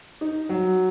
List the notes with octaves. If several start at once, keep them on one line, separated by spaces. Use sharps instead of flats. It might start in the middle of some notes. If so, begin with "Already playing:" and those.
D#4
F#3